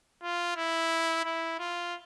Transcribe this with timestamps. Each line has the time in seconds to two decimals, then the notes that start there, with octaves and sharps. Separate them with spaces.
0.22 F4
0.56 E4
1.25 E4
1.59 F4